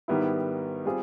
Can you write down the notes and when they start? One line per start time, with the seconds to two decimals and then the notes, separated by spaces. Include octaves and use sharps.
0.08 G#2 D#3 G3 B3 E4
0.85 G3 C4 F4 G#4